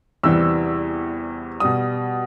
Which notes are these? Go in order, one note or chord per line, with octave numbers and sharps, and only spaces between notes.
E2 C3 E3 G3 E6
B2 G3 D#6